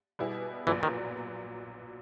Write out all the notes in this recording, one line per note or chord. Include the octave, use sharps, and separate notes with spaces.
B2 G3 B3 E4 G#4
A#1 A#2 E3 F#3 B3
D#3